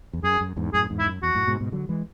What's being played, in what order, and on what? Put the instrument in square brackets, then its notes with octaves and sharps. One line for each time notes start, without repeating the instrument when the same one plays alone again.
[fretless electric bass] E2
[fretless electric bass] F#2 [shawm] G#4
[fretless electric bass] F#2
E2 G#2
[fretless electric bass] F#2 A2 [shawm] G#4
[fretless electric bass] E2 G#2
[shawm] E4
[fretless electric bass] F#2
[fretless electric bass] E2 [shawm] F#4
[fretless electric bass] F#2 A2
G#2 B2
G#2 B2
D3 F#3
E3 G#3